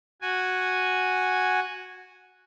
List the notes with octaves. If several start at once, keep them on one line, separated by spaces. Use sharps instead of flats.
F#4 G#5